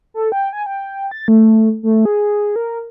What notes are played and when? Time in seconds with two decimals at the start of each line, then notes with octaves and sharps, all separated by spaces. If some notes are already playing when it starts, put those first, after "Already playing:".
0.14 A4
0.32 G5
0.53 G#5
0.66 G5
1.11 A6
1.28 A3
1.83 A3
2.05 G#4
2.56 A#4